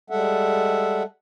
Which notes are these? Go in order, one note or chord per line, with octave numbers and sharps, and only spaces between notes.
G3 G#3 A4 E5 F#5